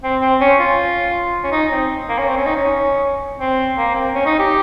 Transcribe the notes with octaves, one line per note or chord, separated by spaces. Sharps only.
C4
C4
C#4
F4
C#4
D#4
C4
A#3
C#4
C4
C#4
D#4
C#4
C4
A#3
C4
C#4
D#4
G4